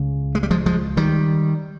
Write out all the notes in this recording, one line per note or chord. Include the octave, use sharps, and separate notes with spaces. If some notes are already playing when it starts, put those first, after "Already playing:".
Already playing: C#2 C#3
G#3
G3
F3 G#3
F3 G#3
D#3 G3